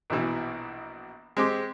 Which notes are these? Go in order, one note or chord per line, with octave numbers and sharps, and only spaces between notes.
A#1 B2 E3
G#3 C4 G4